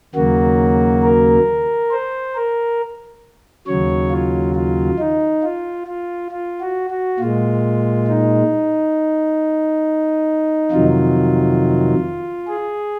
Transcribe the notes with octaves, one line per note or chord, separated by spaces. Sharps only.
D#2 C#3 F#3 A#3 F#4
A#4
C5
A#4
D#2 C#3 F#3 C#5
F4
F4
D#4
F4
F4
F4
F#4
F#4
A#2 G#3 F4
D#4
F2 C3 D#3 F#3 F4
G#4